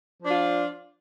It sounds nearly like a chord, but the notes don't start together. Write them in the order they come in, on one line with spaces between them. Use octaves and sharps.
F3 D4 F4